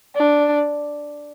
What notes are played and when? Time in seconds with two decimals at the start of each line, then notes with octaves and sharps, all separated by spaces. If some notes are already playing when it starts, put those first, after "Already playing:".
0.16 D4